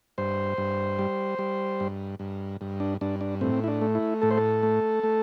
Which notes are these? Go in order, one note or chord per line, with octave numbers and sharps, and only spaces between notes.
G2 C5
G2
G3
G3
G2
G2
G2
D4
G2 D4
D4
A2 C4
E4
D4
A3
E4
A2 A4
C5
A4
A3
A3